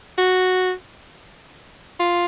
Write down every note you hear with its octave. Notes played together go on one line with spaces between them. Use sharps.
F#4
F4